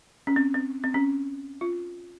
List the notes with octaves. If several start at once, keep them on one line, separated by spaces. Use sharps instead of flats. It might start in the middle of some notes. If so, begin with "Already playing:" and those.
C#4
C4
C4
C4
C#4
F4